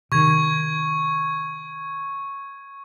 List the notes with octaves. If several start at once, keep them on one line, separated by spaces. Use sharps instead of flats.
C3 D#3 C#6 G#6